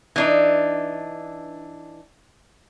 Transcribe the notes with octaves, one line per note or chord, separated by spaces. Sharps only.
E3 D4 D#4